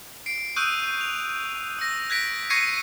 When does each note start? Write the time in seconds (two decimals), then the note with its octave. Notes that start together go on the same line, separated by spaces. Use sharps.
0.26 C7 D7
0.56 C#6 D#6 E6 F#6 G6 D#7
1.01 F7
1.79 E6 A#6
2.10 F#6 G#6 A#6 B6 D7
2.50 C#6 G#6 A#6 C7 C#7 D#7